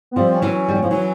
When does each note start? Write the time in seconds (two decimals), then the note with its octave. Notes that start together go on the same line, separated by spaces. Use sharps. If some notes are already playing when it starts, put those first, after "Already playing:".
0.11 B3
0.16 F3 G3 C4
0.34 C#4
0.42 E3 F#3
0.52 C#4
0.68 G3
0.75 F#3
0.83 F3
0.91 E3 F#3